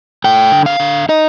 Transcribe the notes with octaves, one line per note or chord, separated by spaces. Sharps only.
A3 G5
D3
F5
D3
D#4 D#5